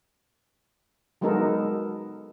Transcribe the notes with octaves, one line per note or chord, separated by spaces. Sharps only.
F#3 G#3 B3 D#4 A4 A#4